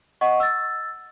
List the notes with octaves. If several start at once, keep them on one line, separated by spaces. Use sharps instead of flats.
D#5 F#5 C#6
E6 A6